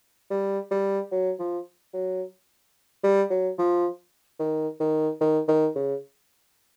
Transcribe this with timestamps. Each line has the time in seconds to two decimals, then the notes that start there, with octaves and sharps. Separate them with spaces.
0.30 G3
0.71 G3
1.12 F#3
1.39 F3
1.94 F#3
3.03 G3
3.30 F#3
3.58 F3
4.39 D#3
4.80 D#3
5.21 D#3
5.48 D#3
5.75 C#3